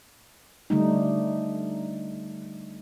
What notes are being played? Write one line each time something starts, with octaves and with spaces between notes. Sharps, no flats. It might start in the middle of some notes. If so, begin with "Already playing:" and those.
D3 G3 A3 D#4